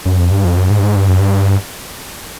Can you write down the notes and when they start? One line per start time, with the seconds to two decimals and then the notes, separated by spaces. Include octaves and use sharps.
0.06 F#2
0.18 F2
0.31 G2
0.45 F2
0.57 F#2
0.70 G#2
0.79 G2
0.83 G#2
0.96 G2
1.08 F#2
1.20 G2